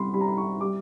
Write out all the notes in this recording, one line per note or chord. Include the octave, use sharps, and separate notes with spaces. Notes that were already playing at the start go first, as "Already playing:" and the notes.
Already playing: C2 B5 C6
G3 B5
A#5
B5
C#6
G3 D6